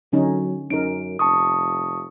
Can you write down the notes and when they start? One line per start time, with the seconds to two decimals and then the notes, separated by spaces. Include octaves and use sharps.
0.13 D3 F#3 C#4 D#4
0.70 F#2 C#4 D#4 A#4 D7
1.19 F1 A5 C#6 D#6